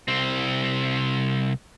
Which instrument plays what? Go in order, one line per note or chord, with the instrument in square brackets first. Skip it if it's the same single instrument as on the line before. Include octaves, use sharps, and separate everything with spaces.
[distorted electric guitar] C2 C4